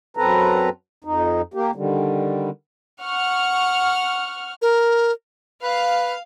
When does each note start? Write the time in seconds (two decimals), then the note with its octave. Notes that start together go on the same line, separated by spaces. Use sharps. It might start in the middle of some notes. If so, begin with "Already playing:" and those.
0.17 F#2 C4 A4 B4 A#5
1.04 F2 D#4
1.54 A#3 G4
1.75 D3 D#3 G3
3.02 F#5 C#6 F6
4.62 A#4
5.63 B4 F5